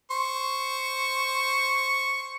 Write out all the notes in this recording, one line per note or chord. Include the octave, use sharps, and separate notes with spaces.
C5 C#6